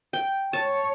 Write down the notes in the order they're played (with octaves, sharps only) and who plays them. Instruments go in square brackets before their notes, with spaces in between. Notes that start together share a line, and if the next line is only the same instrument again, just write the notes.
[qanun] G5
[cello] C#5 [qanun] A5